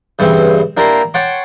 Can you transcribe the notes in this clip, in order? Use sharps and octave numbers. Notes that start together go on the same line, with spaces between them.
G2 C#3 E3 C4
A#3 D4 E4 G4 A#4 C5
C#5 F#5 G5 A5 C6 D6